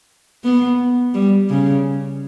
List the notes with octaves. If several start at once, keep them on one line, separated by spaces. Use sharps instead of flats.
B3
G3
C#3